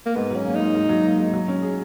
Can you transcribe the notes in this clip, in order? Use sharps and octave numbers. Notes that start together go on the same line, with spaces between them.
A#3
G#2 B3
F#3 C#4
A#3
G#2 D#4
G#2
F#3
A#3
G#2
F#3
C#4
G#4